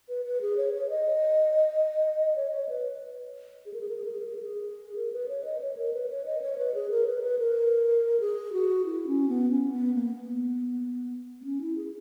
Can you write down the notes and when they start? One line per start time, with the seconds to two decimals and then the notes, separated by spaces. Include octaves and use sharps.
0.09 B4
0.25 B4
0.41 G#4
0.57 C#5
0.74 C#5
0.90 D#5
2.36 C#5
2.52 C#5
2.69 B4
3.66 G#4
3.74 A#4
3.81 G#4
3.88 A#4
3.96 G#4
4.04 A#4
4.12 G#4
4.19 A#4
4.28 G#4
4.35 A#4
4.43 G#4
4.96 A#4
5.12 B4
5.28 C#5
5.44 D#5
5.61 C#5
5.77 A#4
5.93 B4
6.10 C#5
6.26 D#5
6.42 C#5
6.58 B4
6.74 G#4
6.90 A#4
7.07 B4
7.23 B4
7.39 A#4
8.20 G#4
8.53 F#4
8.85 E4
9.07 C#4
9.29 B3
9.50 C#4
9.72 B3
9.94 A#3
10.15 B3
11.41 B3
11.45 C#4
11.61 E4
11.77 G#4